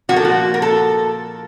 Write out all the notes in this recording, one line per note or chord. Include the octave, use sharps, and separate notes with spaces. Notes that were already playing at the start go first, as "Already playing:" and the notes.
A#2 F3 A#3 F#4
A4
F#4
A#4
A4